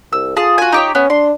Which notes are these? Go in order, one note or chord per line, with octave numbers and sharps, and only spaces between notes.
C2 E6
F4 G#4 A5
F#4 G#5
D#4 G4 C#5
B3 C#4
D4 C6